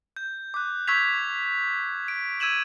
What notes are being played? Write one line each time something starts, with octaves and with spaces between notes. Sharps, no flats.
G6
D6 F#6
C#6 E6 G6 G#6 B6 F7
D7
E6 G#6 D#7 E7 F#7